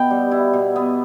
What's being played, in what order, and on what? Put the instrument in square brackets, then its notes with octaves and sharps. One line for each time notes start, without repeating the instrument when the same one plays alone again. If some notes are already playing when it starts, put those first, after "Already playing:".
Already playing: [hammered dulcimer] B2 B3 E4 [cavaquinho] G5
[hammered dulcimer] G3
E4
B2
B3